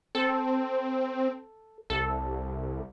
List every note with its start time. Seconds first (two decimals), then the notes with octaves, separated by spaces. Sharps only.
0.15 C4 A4
1.90 C2 A4